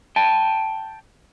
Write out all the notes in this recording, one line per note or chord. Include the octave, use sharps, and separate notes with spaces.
G5 A5